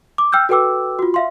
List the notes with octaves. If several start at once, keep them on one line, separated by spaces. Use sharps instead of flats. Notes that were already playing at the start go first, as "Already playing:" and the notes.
D6
G5 E6 F6 G6
F#4 A4 B4 G5 D6 E6
F4 F#4
E5 F5 C6